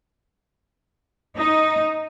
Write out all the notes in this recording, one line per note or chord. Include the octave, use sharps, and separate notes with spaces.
D#4